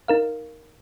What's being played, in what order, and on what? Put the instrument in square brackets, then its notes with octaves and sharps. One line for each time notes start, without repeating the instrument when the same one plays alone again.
[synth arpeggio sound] D#4 A#4 F5